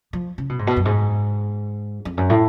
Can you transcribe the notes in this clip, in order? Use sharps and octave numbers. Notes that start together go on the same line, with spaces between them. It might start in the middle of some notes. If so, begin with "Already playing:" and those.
F3
C#3
B2
G#2
B2
F#2
G#2
F2
F#2
A2